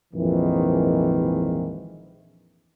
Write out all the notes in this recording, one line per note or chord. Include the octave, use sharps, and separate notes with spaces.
A#1 F2 G#2 D#3 E3